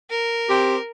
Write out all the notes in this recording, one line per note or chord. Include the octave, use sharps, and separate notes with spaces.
A#4
C4 G4